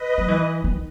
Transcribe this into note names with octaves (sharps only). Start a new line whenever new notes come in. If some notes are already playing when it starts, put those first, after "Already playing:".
Already playing: B4 D#5
F#3
E3
D#3